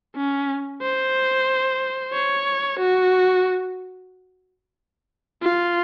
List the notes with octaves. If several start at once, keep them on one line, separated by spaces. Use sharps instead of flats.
C#4
C5
C#5
F#4
F4